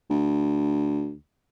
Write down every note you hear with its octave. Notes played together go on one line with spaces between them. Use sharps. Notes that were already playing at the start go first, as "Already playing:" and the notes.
D2